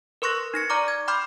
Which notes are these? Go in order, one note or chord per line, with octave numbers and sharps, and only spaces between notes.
A#4 B4 C6 C#6 F#6 A#6
D#4 A#6 C#7
D5 A#5 C#6 D6 F6
G#6
G5 B5 C6 D6 F6 G6